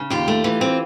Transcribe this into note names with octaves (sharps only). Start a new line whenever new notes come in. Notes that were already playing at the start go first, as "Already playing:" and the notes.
Already playing: C#3
D#2 F4 G4
A3
E3
C4